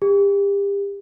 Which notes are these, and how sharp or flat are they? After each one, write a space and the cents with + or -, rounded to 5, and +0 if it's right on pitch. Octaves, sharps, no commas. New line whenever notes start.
G4 +35